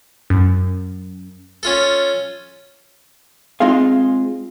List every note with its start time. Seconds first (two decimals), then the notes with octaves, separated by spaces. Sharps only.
0.30 F#2
1.63 C#4 F4 A4
3.60 G#3 C4 D#4 F4 G#4 F5